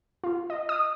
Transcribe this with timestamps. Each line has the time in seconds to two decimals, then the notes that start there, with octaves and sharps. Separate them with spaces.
0.24 F4
0.50 D#5
0.69 D#6